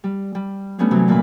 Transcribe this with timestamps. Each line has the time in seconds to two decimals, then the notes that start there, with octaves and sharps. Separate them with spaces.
0.04 G3
0.35 G3
0.78 G3 A3 B3 C#4 D4
0.91 C3 E3 F#3 C4 D4
1.08 F2 A#2 C#4 B4 B5